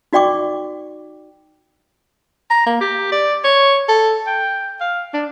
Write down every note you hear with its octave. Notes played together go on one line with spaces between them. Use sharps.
D#4 F#4 D5 G5 C#6 D6
A#5
A#3
G4
D5
C#5
A4
G5
F5
D4